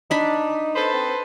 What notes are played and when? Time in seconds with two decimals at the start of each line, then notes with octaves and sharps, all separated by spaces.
0.11 D4 D#4 B5
0.76 A4 B4 C5
0.93 C4